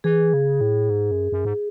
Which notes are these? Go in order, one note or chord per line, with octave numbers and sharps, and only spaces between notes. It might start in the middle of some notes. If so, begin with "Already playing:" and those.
E3 G#4
C#3
A2
G#2
F#2
F#2
G#2